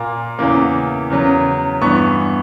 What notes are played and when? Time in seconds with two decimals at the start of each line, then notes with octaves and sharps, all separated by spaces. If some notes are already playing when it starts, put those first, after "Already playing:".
Already playing: A#2 A#3
0.39 E2 C#3 E3 A#3
1.10 E2 C#3 F#3
1.82 G2 E3 B3 C#6